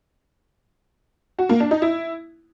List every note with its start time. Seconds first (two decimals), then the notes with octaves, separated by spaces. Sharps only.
1.39 F#4
1.49 A#3
1.60 D4
1.71 D#4
1.82 E4